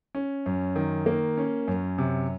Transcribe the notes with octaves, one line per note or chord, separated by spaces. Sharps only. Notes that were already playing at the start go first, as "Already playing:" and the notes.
C#4
F#2
D#3
A#3
C#4
F#2
C3